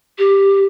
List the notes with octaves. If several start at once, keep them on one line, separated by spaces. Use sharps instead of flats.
G4